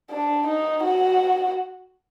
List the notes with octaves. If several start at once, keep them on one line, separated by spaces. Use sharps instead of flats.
D4
D#4
F#4